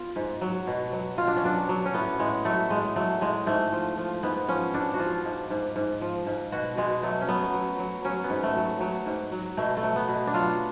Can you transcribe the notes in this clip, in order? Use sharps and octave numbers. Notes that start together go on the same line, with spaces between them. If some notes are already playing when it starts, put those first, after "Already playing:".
Already playing: B3 F4
G#2
F#3
B2
F#3
B2 F4
D4
C#4
F#3 D4
F#3
C#4
A2 B3
A2 G#3
F#3 A3
A2 G#3
F#3 A3
A2 G#3
G#2 A3
F3
F3
G#2 B3
F3 C#4
G#2 D4
F#4
F3 F4
G#2
G#2
G#2
F3
G#2
B2 F#4
B2 G#3
F#3 A3
C#4
F#3 B3
F#3
F#3
F#3 C#4
B3
G#2
A3
F#3
F#3
G#2
F#3
B2 A3
A3
F#3
B3
B2
D4
F#3 F4